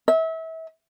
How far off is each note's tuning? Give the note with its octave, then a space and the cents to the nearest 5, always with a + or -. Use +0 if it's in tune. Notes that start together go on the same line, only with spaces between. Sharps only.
E5 -30